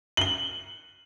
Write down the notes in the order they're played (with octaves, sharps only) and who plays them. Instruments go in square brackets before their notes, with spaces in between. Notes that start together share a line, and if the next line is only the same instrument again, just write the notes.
[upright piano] F#7 G7